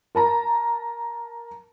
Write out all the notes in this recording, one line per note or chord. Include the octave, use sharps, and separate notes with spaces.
A#4 A5 A#5